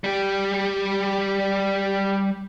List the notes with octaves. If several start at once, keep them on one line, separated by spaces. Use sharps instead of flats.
G3 G4